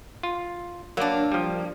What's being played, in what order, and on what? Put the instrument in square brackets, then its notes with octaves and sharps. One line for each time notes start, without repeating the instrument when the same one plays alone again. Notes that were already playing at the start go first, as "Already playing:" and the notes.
[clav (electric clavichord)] F4
[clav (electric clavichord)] F#3 D5 [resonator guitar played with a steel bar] A#3 D4
[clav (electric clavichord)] F3 G3